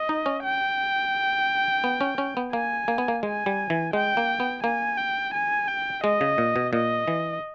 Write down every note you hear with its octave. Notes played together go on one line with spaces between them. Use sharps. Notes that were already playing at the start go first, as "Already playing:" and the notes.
Already playing: D#5
D#4
C#4
G5
B3
C#4
C#4
B3
A#3 G#5
A#3
B3
A#3
G#3 G#5
G3
E3
G#3 G5
A#3
B3
A#3 G#5
G5
G#5
G5
G#3 D#5
C#3
A#2
B2
A#2 D#5
E3